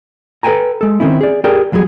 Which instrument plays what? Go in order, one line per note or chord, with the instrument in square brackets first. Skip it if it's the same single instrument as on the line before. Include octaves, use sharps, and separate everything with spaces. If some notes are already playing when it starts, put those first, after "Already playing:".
[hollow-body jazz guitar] A4 B4 F5 G5 G#5 A#5
G#3 A4
D#3 G#3 C4 C#4 E4
G#4 D5
G4 G#4 A#4 D5 G5
E2 F#3 G3 F4 G#4